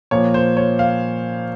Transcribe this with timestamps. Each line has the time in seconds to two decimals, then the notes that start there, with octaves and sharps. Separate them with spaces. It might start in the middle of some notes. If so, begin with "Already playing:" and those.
0.11 A#2 F3 A#3 C#5
0.34 C5
0.57 C#5
0.79 F5